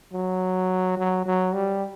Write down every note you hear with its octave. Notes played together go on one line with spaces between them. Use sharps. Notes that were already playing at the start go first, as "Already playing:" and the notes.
F#3
F#3
F#3
G3